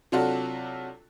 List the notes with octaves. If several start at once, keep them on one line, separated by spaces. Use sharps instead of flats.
C3 F#3 D4 F4 F#4 A4